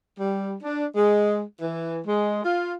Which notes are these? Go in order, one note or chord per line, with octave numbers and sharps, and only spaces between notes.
G3
D4
G#3
E3
G#3
F4